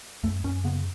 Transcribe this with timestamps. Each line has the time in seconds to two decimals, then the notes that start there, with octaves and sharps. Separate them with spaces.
0.23 F#2 A3
0.44 F#2 C#4
0.64 C#3 B3